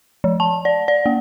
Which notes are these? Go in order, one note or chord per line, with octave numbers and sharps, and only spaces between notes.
F3
A5
D5
D5
A#3